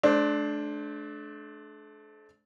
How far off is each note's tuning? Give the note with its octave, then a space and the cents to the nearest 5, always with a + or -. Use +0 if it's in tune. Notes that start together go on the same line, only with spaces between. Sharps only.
A3 -40 D4 +0 C5 +10